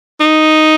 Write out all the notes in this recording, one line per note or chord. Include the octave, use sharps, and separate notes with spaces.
D#4